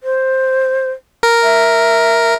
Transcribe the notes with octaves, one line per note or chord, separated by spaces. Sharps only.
C5
A#4
E5